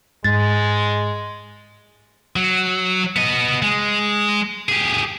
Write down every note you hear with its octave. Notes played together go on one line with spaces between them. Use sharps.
G#2 G#3 A6
F#3
B3 D#5
G#3
G4 G#4